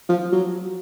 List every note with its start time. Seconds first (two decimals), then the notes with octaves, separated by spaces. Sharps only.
0.09 F3
0.32 F#3